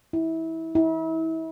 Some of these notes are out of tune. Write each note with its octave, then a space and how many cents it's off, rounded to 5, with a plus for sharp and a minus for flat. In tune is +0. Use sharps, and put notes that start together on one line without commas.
E4 -25
E4 -35